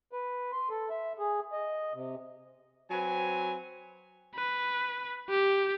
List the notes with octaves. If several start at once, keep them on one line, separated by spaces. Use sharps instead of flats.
B4
C6
A4
E5
G#4
D#5
C3
F#3 C4 B4 G#5
B4
G4